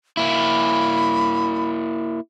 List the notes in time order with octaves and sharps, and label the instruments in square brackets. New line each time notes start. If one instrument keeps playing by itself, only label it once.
[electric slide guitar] A#3 E4 [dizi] B5